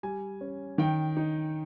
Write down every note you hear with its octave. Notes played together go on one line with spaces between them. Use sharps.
G3 G#5
C#4
D#3 G5
D#4